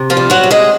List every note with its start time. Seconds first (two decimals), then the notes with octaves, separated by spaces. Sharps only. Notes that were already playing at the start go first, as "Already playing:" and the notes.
Already playing: C3
0.10 F3 F4
0.17 G3
0.30 F#3 F#4
0.43 C3
0.51 G#3 G#4